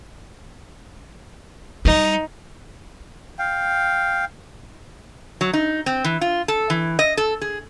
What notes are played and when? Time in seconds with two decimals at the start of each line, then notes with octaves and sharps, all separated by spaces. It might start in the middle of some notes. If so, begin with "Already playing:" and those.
1.85 G3 D#4
3.39 F5 G5
5.41 F#3
5.53 D#4
5.86 C4
6.04 E3
6.21 F4
6.48 A4
6.70 E3
6.99 D#5
7.17 A4
7.41 G#4